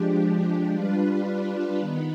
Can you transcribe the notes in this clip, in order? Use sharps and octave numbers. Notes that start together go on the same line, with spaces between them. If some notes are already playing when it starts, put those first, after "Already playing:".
Already playing: F3 G#3 D4 G4
G3 D4 F4 B4
D#3 B3 D#4 B4